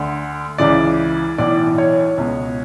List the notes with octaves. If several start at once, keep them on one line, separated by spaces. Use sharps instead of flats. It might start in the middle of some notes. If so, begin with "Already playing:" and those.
Already playing: D2 D3
C#2 C#3 E3 D5
B1 A2 E3 D5
C#5
C#2 B2